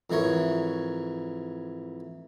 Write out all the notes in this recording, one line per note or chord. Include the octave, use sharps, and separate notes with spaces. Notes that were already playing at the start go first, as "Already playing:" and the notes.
F2 G#2 E3 A#4 C#5